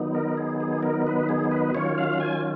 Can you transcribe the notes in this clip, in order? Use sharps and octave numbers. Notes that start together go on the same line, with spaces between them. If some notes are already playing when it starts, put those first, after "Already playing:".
Already playing: D#3 F#3 B3 D#4
A#4
G#4
G#4
A#4
B4
G#4
B4
D#3 F#3 C#4 F4 C#5
F5
G#5